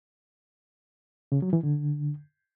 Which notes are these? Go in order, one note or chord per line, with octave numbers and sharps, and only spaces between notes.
C#3
F#3
E3
D3